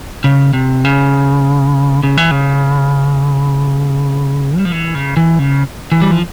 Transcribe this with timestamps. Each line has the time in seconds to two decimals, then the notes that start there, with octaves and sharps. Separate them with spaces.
0.24 C#3
0.53 C3
0.85 C#3
2.03 C#3
2.17 E3
2.31 C#3
4.58 G3
4.65 F3
4.72 E3
4.95 C#3
5.17 E3
5.39 C#3
5.92 E3
6.02 G3
6.11 F3